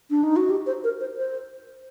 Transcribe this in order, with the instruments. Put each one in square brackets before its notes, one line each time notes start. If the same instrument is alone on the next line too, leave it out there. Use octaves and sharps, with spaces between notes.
[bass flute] D4
D#4
F#4
G4
C5
A#4
C5
C5